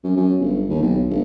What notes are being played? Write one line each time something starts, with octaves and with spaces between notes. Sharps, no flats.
F#2
F#2
G1
D#2
B1
G1